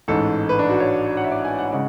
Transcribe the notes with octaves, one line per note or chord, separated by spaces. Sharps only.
A1 G#2 G#3 A4
B4
D4
F#4
C#5
F#5
E5
D5
G#5
F#5
C#3 G#3 F#5